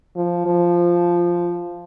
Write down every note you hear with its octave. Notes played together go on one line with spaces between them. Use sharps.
F3
F3